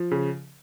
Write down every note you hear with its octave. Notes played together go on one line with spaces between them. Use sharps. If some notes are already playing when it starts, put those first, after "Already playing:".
Already playing: F3
C#3